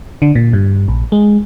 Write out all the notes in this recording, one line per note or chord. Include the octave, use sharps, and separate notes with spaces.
D3
A#2
G2
A#1
G#3